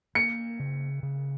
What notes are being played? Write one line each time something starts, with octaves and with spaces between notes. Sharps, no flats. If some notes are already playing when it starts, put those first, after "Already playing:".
A#3 C#7
C#3
C#3